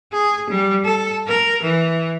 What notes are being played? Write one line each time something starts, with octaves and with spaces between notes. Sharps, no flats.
G#4
G3
A4
A#4
E3